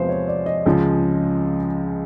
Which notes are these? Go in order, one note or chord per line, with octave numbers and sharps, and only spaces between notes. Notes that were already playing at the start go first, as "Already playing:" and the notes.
Already playing: E2 C3 F3 G#3 B4 C5 F5
C#5
D5
D#5
C#2 C#3 F3 G#3